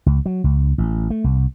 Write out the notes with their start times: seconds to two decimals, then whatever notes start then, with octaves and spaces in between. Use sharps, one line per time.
0.06 C#2
0.26 F#3
0.44 C#2
0.78 A1
1.10 A3
1.24 C2